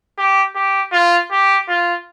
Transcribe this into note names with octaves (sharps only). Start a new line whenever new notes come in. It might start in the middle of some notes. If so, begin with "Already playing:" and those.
G4
G4
F4
G4
F4